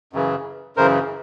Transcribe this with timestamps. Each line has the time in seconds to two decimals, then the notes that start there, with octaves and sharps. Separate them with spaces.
0.13 F#2 C#3 E3
0.77 F#2 C#3 E3 A#4 C5